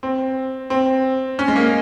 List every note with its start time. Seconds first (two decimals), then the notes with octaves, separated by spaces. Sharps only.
0.03 C4
0.70 C4
1.39 C#4
1.48 G#3
1.56 A#3